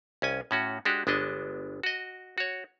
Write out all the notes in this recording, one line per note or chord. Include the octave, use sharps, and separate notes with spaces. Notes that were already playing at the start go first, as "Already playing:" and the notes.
C2 C#4 G#5
A2 C#4 F#4
G#3 D4 F#4 G4
G1 G#3 B3 D4 D#5
F#4 D#5
F#4 C#5